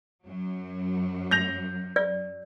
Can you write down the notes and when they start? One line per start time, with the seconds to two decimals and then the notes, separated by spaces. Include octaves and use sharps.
0.25 F#2 F#3
1.31 G6 A#6 F7
1.96 D5